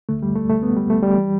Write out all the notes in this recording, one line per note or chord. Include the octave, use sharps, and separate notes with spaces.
D2 D3 A3
G3
A3
A3
B3
G3
A3
G3
E3